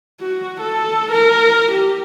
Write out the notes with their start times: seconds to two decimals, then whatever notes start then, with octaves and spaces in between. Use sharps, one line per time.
0.21 F#4
0.61 A4
1.11 A#4
1.71 G4